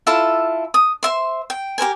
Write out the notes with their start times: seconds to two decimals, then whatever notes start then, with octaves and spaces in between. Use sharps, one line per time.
0.07 E4 F4 A4 E5
0.74 D#6
1.03 C5 E5 C6
1.50 G5
1.78 G4 A#4 C5 G#5